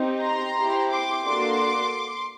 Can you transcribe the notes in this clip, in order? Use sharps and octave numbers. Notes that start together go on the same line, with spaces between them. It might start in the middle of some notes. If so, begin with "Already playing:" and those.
Already playing: C4 D#4 G4
A#5 C6
C4 E4 G4
C6 D6
A#3 D4 F#4 A4 C6 D6